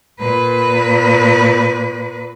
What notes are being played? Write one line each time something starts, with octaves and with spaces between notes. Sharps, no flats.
A#2 B4